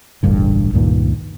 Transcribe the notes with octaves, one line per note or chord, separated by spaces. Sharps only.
E1 A1 G2 D3
C#2 G2 A#2 D#3